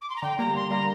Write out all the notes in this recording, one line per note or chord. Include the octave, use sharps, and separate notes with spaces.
D6
C6
A#5
D3 G5
G3 A#3 A#5
D3 C6
G3 A#3 A#5